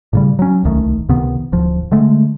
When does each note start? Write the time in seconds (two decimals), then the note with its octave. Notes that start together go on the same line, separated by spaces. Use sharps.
0.13 A2 C#3 G3
0.39 F#3 C#4
0.63 D1 C2 D#3 A3
1.09 C#2 C3 D#3 B3
1.52 D1 F3
1.92 D3 G#3 A3